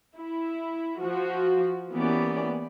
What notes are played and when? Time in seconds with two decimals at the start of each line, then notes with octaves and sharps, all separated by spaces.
0.16 E4
1.00 F3 F#4
1.92 E3 A#3 B3 C#4 G4 D5